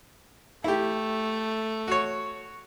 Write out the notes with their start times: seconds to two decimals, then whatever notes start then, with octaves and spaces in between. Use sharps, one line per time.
0.64 A3 E4 G4
1.88 F#4 C#5